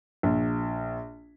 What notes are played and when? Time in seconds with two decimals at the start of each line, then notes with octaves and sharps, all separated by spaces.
0.23 A#1